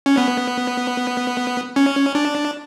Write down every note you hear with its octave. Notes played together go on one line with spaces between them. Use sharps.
C#4
B3
C#4
D4